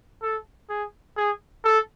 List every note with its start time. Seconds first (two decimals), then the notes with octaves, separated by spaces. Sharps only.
0.22 A4
0.69 G#4
1.17 G#4
1.64 A4